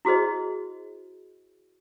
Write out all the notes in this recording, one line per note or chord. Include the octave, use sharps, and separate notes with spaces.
E4 F#4 G#4 C5 D#5